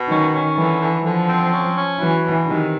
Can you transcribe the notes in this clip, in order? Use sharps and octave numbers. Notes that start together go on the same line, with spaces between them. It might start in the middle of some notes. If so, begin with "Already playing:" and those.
Already playing: B2
D#3 C#4
C#4
D3 E3
D3
D3 F3
C4
C#4
C#4
E3 F#3
B2
C3 D#3